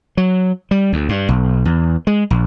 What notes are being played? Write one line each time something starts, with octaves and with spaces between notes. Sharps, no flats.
F#3
G3
D2
G2
B1
E2
G#3
A#1